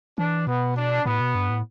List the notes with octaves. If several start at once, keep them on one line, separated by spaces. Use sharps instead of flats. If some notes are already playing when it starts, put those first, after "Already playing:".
E3 D4
B2 B3
D4
A2 B3
B2
G2
A2